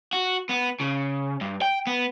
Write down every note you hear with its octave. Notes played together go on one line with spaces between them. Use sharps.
F#4
B3
C#3
G2
G5
B3